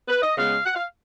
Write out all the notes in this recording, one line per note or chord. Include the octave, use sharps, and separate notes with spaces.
B4
D#5
C#3 G#3 B3 F5
F#5
F5